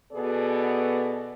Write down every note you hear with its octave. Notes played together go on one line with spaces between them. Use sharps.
B2 B3 G#4 A4 D5